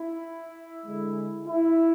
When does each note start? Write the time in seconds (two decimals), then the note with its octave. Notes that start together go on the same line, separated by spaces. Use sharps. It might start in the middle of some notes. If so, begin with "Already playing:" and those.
Already playing: E4
0.84 D3 G#3
1.47 E4